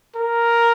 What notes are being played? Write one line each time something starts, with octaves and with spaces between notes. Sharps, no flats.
A#4